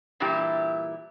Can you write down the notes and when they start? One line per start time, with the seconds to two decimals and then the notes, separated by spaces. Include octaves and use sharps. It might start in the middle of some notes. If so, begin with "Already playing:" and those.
0.20 G2 A#2 E3 E4 G4